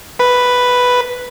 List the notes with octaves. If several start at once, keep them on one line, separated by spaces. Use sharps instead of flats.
B4